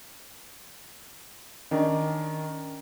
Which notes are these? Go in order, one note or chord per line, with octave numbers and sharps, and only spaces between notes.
D#3 C#4 D4